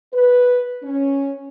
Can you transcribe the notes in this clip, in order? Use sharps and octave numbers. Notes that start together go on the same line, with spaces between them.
B4
C#4